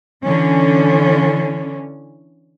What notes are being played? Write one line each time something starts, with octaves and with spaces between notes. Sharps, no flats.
D3 E3 C#4